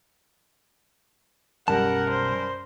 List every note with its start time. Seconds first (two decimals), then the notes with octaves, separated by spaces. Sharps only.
1.68 B1 F#2 F#3 G3 A#4 F#5 A5
2.10 C5